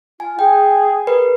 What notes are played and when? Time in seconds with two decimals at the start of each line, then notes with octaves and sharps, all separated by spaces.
0.20 F4 G#5
0.39 G#4 G5
1.07 A#4 B4